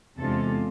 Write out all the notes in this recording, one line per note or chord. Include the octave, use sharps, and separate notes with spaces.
E2 C3 G#3 D4 F4 A4